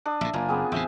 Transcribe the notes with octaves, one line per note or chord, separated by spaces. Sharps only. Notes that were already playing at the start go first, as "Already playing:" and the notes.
D4 D#6
A#1 A2 E5
F#1 A#3 F4 G#5
B3 C4 G#4
E2 A2 C3 C5 E5